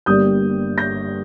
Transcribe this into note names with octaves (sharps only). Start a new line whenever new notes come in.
G1 G2 G3 A#3 D#6 G6
G6 A#6